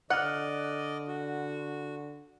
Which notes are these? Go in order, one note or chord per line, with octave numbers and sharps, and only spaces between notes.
D3 D5 D#5 F#5 F6 F#6
F#4